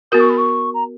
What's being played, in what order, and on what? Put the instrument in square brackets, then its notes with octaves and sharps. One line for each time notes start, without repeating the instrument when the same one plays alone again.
[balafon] B3 F#4 A#4 [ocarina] D#6
[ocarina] C#6
B5
C#6
A#5